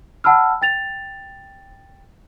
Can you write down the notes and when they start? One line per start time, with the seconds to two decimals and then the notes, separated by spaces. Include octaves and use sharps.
0.24 F#5 A5 B5 E6 F6
0.62 G5 A6 F7